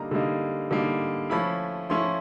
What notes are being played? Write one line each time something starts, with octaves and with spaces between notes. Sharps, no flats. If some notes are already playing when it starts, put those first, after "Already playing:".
Already playing: D3 G3 A#3 D#4 A#5
D3 G3 A#3 D#4
D3 G3 A#3 D#4
F3 A3 C#4 E4 B5
F3 A3 C#4 E4 C6